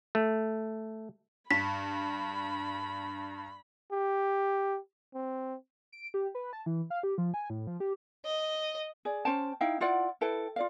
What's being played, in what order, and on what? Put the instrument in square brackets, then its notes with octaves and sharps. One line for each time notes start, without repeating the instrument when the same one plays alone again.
[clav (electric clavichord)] A3
[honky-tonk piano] G2 [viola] B5 [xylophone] B6
[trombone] G4
C4
[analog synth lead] D7
G4
B4
A5
E3
F5
G4
F3
G#5
A2
F3
G4
[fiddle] D#5
[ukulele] G#4 D5
C#4 C5 G5 A5
D#4 E4 F5 G5
E4 F4 D5 F#5
E4 A4 B4 G5
F4 D5 F5